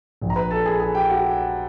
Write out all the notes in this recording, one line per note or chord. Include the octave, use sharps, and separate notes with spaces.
A#1 A#2 F3
A#5
B4 B5
A4 A5
G#4 G#5
G#4 G#5
G4 G5
F#4 F#5